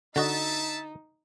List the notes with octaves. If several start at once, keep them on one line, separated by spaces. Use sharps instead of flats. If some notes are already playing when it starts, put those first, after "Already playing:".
D3 D#4 F#4 D#5 E5 A5